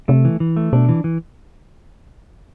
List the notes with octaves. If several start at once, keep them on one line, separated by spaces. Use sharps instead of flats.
C3 A3
E3
E3
A3
B2 D4
E3
E3